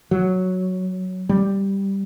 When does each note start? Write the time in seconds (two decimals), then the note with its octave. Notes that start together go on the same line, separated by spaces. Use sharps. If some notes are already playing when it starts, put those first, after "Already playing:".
0.11 F#3
1.29 G3